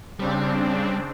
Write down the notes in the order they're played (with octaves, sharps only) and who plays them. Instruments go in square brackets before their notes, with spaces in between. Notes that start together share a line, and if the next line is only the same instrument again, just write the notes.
[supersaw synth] C#3 C4 D4 [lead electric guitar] G3